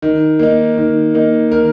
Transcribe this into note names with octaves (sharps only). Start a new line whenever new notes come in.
D#3
A#3 D#4
D#3
A#3 D#4
D#3 A#4